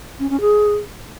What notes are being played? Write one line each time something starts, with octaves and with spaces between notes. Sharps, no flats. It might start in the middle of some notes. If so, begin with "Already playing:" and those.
C#4
C#4
G#4